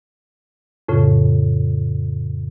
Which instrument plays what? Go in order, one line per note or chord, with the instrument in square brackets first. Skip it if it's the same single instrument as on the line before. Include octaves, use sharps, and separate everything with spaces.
[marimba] F2 A2 C#3